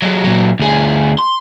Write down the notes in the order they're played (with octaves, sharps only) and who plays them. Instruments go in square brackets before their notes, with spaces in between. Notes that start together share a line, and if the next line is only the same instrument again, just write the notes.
[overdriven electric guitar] F#3 G#3
A#2 F#3
D2 G#4
C6